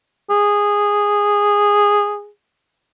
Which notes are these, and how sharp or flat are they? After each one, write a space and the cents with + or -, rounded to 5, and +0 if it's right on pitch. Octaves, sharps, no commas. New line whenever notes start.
G#4 -10